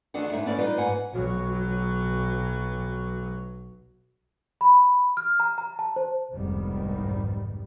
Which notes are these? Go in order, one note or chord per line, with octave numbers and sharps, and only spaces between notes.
D2 D3 D#3 D4 G#4 F#5
G#2 G#3 D#4 E5
B3 C#4 E4 D5
G3 D#4 F4 B4 F5
G#2 B4 F#5 G#5
B1 F#3
B5
F6
A#5
A#5
A5
C5
F1 C2 G#2 D#3 G3 B3